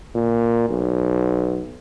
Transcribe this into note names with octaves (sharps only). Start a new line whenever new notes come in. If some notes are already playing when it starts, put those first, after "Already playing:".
A#2
B1